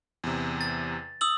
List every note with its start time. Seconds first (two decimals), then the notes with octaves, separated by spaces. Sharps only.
0.24 E2 C3
0.61 A6
1.21 D#6 E6 F#7